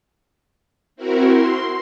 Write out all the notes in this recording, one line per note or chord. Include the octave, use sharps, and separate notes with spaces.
C4 E4 F#4 A#4
C6